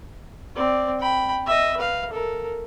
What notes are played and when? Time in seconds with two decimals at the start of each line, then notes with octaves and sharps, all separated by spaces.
0.55 C4 D5
1.00 G5 B5
1.46 D#5 E5
1.77 B4 F5
2.10 A4 A#4